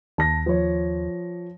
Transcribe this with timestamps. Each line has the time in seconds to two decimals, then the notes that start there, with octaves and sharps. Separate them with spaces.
0.18 D#2 A5 A#6
0.46 F3 C#5